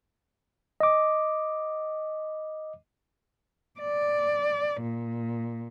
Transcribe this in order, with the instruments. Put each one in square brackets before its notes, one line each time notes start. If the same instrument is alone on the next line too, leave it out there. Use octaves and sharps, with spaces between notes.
[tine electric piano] D#5 D6
[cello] D5
A#2